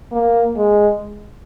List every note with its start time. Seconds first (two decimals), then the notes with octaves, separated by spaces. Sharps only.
0.12 A#3
0.56 G#3